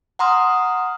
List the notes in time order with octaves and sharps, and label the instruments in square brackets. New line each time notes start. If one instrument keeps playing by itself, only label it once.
[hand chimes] F#5 A#5 C6 D#6 F6